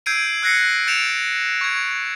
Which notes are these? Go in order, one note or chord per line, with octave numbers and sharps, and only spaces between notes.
E6 G6 G#6 C7 D7 D#7
E6 F#6 G#6 A#6 C7 C#7
G6 A6 C#7 D7 E7 F7
C#6 G#6